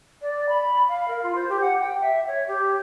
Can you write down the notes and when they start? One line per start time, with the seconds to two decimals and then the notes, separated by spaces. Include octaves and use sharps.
0.22 D5
0.49 B5
0.88 F5
1.08 A#4
1.23 F4
1.36 C5
1.49 G4
1.61 F#5
1.80 G5
2.02 E5
2.27 C#5
2.48 G4